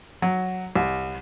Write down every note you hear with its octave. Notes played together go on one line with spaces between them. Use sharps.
F#3
C2